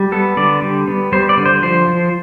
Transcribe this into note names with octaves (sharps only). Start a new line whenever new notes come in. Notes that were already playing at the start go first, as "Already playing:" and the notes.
Already playing: G3
B3 A4
D3 D5
G3
B3
G3 C5
D5
D3
C5
F3 C5
F3